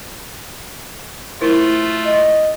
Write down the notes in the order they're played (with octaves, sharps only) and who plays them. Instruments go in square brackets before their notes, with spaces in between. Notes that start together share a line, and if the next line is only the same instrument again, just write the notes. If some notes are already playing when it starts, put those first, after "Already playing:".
[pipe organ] A3 F4 [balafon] E4 A#4 C5
[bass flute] D#5